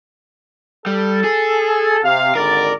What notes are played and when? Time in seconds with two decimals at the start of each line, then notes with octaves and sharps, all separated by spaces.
0.86 G3 A4
1.24 G#4
2.04 C3 F5
2.35 G#1 D3 A#4 D5